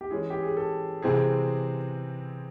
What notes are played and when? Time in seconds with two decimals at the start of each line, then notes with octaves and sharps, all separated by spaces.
0.01 G4
0.11 E3 G#3 C#4 G#4
0.30 G4
0.43 G#4
0.57 A4
1.02 C3 E3 G#3 C4 G#4